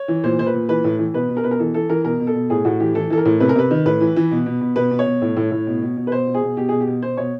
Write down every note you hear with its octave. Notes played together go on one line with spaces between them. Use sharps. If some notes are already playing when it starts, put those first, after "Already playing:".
Already playing: C#5
E3
A#2 C5
A#2 C5
B4
A#2
E3 B4
A2
E3
B2 B4
B2
A#4
B2 B4
A#4
E3 A4
E3 A4
E3 A#4
B2 A#4
B2
A4
B2
A2 G#4
A2 F#4
E3 G4
E3 A4
E3 A4
A#4
A2
C3 B4
A#4
C3 B4
D#3
A2 B4
E3
E3
B2
B2
B2
B2 B4
B2
C#5
B2
A2
A2
A2
B2
B2
B2
B4
B2 C5
B2
G#4
B2
B2 G4
B2 G#4
G4
B2
B2 C5
B2 C#5